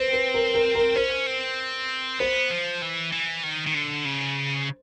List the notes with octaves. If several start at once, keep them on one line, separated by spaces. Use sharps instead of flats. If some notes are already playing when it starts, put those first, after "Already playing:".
Already playing: C4 B4 C5
B4
A#4
A#4
A#4
C#4 C5
C4
B3 C5
F3
E3
E3
D#3
D#3
D3
C#3